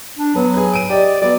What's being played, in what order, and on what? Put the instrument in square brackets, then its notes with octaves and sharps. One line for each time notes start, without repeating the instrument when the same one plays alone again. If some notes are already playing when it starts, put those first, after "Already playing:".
[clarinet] D4
[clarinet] F#3 [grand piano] B3
[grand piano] G#4 B4
D7 D#7
[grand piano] G4 D#5 [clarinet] D5
[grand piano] F#3 B3 [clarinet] D5